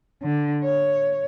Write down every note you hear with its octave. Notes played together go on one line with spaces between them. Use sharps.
D3
C#5